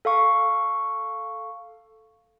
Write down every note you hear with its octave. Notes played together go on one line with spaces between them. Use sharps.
A4 F5 C#6